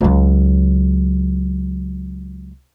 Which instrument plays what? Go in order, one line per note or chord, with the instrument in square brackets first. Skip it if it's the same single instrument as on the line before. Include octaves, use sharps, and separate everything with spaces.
[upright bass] C#2 F#3